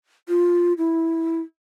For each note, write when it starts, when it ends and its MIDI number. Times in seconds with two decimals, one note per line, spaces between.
0.28 0.73 65
0.78 1.40 64